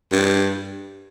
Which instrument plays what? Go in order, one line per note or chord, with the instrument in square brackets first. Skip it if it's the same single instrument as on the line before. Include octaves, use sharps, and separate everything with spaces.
[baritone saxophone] G2